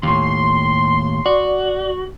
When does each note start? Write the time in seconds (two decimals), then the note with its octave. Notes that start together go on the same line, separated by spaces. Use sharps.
0.03 D#2 A2 C6
1.26 F#4 D5